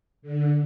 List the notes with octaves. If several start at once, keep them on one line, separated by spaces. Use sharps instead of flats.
D3